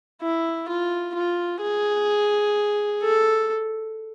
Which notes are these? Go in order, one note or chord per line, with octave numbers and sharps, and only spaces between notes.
E4
F4
F4
G#4
A4